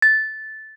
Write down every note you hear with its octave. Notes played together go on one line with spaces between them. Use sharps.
A6